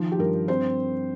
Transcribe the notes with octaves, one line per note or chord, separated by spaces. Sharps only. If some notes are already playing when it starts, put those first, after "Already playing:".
Already playing: D#3 F3
G4
G2 A#4
C4 C5